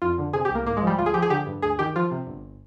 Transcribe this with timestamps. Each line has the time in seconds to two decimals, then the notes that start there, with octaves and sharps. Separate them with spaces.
0.02 F2 F4
0.18 D3
0.33 C3 G#4
0.45 C2 G4
0.55 A#3
0.66 G#1 A#3
0.77 G#3
0.82 F3
0.87 G3
0.98 D2 F4
1.06 G#4
1.14 F3 G4
1.22 G#4
1.30 D3 G4
1.46 G2
1.62 D2 G#4
1.79 D#3 G4
1.96 F3 F4
2.11 C3
2.27 G1